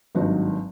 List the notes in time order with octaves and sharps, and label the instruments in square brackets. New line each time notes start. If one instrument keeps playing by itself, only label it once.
[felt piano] G#1 G2 D#3 F#3 F#4